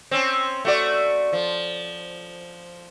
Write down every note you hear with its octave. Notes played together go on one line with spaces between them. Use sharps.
C4 C#4
A3 F#4 D5
F3